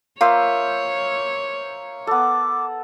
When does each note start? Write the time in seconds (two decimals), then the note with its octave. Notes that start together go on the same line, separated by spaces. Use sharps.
0.21 A#3 F4 C5 C#5 E5
2.07 B3 A4 D6